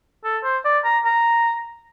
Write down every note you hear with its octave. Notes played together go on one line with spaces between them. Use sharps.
A4
C5
D5
A#5
A#5